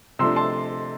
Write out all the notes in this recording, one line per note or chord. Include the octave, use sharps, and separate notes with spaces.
C3 F3 A3 D4 C6 E6
A5 C6